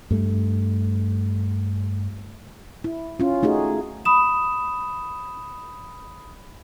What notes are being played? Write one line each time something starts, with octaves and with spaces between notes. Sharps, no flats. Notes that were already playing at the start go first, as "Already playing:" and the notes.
G2 A3
E4
C#4 F4
A3 D#4 F#4 G#4
B5 D#6 E7